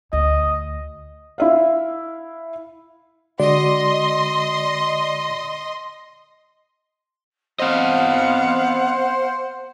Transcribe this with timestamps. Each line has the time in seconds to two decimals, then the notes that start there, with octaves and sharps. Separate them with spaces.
0.13 D2 D#5
1.38 E4 E5 F5
3.40 D3 G#3 F#4 D5 D#5 C6
7.59 B3 C4 C5 D#5 F5 F#5